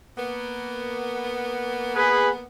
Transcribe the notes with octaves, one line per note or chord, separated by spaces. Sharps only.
A#3 B3
G#4 B4